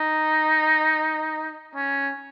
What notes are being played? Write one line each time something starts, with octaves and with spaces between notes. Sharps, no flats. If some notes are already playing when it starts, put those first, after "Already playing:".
Already playing: D#4
C#4